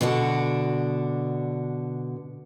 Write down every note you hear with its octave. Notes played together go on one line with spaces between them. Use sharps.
B2 D3 D4 F#4